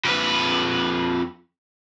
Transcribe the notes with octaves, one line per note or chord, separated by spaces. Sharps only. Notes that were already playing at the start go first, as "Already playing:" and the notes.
F2 B4